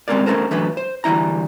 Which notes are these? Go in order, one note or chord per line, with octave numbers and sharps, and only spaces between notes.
G3 G#3 C4 C#4 A#4 D5
A3 C#4 D#4 A4 A#4 C5
E3 F#3 A3 D4 B4
C5
D2 E3 G3 E4 A#5